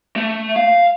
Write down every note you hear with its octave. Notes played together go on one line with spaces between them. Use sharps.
A3
F5